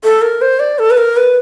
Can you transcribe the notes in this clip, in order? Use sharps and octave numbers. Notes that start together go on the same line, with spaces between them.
A4
A#4
C5
D5
A4
B4
A#4
B4